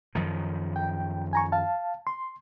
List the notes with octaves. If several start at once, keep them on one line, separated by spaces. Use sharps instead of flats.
F#2 D#3 F3
G5
G#5 A#5 C#6
F5 A5
C6